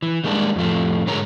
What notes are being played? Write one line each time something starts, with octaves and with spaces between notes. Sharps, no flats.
E3
D#3 G3 G#3 A#3 D4
F2 A2 F3 A3
G#2 D3 G#4 A#4 C#5 A#5